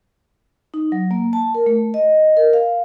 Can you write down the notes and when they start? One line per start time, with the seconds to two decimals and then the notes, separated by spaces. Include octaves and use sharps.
0.74 D#4
0.92 F#3
1.11 A#3
1.33 A5
1.54 A#4
1.66 A3
1.94 D#5
2.37 A#4
2.53 F5